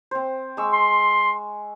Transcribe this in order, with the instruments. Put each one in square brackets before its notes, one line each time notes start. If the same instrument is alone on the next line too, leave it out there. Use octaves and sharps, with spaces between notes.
[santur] C4 C5
G#3 C#6 E6
[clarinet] C6